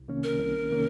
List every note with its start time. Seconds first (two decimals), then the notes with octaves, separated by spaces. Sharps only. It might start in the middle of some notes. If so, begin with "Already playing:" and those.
Already playing: C2
0.08 C3 D#3 A#3 C#4
0.23 A#4
0.40 C2
0.71 C3 D#3 A#3 C#4